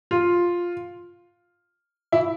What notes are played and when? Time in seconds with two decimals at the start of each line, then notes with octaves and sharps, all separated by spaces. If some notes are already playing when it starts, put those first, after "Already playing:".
0.11 F4
2.12 E4